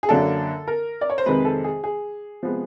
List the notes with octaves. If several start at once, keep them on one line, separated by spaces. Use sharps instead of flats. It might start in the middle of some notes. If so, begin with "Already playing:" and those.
G#4
F#2 D3 F#3 A#3 D4 A4
A#4
D5
C#5
C5
F2 C3 D#3 G#3 C4 B4
A4
G#4
G#4
C3 F3 G#3 B3